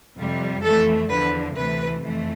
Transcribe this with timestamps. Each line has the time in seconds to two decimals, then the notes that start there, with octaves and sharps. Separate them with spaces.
0.16 F2 C3 G3
0.62 F2 E3 A3 A4
1.09 E2 D3 F3 B4
1.55 D2 C3 E3 A3 B4
2.02 F2 E3 A3